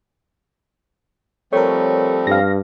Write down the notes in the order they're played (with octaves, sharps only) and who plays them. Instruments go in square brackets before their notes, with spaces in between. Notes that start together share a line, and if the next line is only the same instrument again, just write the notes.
[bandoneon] F3 G3 C4 [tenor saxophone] A3 [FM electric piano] A#4 C#5
[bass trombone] G2 [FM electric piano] F5 A#6